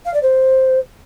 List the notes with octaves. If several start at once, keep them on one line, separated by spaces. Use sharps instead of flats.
F5
D5
C5